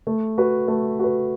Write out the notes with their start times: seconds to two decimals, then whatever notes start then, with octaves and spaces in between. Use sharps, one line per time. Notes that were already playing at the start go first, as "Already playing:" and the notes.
0.07 A3
0.38 F#4 B4
0.68 A3
0.99 F#4 B4